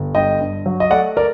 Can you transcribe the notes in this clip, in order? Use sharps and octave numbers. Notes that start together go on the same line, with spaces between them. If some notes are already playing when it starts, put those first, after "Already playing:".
Already playing: G1
G2 D#5 G5
G2
F#3
D#5
A3 D5 F#5
A#4 D5